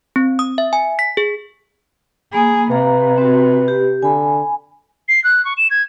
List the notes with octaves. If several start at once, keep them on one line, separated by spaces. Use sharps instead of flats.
C4
D#6
E5
G#5
B6
G#4
A#3 G#4 B5
C3 B4 F5 A#5
C4 F#4
G4
D3 G#5 B5
C7
F#6
C#6
E7
G#6